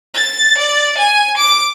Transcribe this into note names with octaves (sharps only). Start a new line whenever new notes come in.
A6
D5
G#5
D6